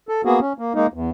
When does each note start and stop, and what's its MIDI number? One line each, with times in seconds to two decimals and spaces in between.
0.09 0.22 69
0.25 0.39 58
0.25 0.39 59
0.25 0.39 66
0.25 0.39 68
0.40 0.53 61
0.58 0.73 58
0.75 0.87 56
0.75 0.87 58
0.75 0.87 63
0.94 1.10 40